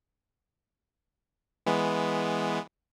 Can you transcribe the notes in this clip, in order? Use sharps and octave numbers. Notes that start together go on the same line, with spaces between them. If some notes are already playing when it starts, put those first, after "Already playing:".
E3 G#3 B3